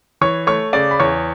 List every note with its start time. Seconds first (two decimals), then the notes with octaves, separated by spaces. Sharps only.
0.21 E3 C#5 C#6
0.47 A3 C#5 C#6
0.73 C#3 D5 D6
0.91 B5
0.99 E2 C#5 C#6